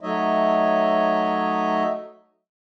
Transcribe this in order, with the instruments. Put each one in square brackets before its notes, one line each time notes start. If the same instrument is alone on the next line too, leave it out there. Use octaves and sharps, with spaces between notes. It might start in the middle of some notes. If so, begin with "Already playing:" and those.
[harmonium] F#3 A3 D#4 C#5 D#5 E5